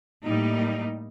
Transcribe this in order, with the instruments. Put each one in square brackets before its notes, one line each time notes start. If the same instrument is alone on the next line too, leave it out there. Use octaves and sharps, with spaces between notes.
[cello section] A2 G3 A#3 D#4